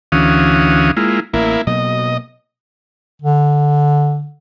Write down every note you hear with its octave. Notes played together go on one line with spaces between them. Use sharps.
D2 E3 C#4 F#4 F5 D#6
G#3 A#3 E4 F4
A1 A#3 E4
B2 F#3 A#3 D#5
D3